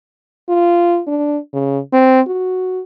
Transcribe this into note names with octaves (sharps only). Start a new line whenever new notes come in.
F4
D4
C#3
C4
F#4